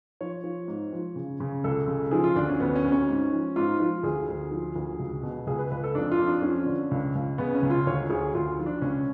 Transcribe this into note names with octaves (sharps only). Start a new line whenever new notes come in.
F3 C#5
F3
G#2
F3
C#3
C#3
C#2 A4
C#3
F3 G#4
F4
D2 D4
C#4
D2 B3
C#4
D2
C#4
G#2
F3
G#2 F4
F3 F4
D2 G#4
D2
F3
D2
C#2
B2
C#2 G#4
B4
C#2 B4
A4
F2 D4
F4
F2
D4
F3 C#4
D3
C#2
C#2
C#3 B3
C#4
C#2
F4
D2 C#5
D2 G#4
D2 F4
F3
D4
C#2 C#4